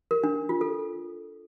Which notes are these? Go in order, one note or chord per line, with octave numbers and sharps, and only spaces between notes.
A#4
D4
F4
A4